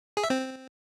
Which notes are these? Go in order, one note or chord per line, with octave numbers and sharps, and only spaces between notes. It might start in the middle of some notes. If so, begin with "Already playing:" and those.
G#4
E5
C4